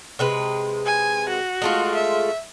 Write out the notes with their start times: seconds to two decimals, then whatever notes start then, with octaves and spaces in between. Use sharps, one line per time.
0.19 C3 G#3 B4
0.86 G#5
1.29 F#4
1.62 G#3 A3 F4
1.94 E5